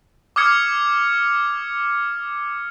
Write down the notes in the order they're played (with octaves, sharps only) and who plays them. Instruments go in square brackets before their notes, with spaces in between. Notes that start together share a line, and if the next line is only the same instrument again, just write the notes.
[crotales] D6 D#6 F6 G#6 C#7